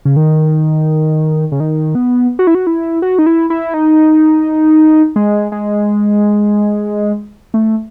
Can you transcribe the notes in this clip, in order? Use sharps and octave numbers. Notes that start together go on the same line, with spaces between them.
C#3
D#3
C#3
D#3
B3
F#4
E4
F#4
E4
F#4
D#4
E4
E4
D#4
G#3
G#3
A3